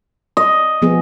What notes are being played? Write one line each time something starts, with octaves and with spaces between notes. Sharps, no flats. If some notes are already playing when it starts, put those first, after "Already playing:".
D#5
F3 B3 G#4